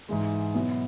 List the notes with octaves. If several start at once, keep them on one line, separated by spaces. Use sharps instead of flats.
G#2 E3 G#3
B2 F#3 B3 E4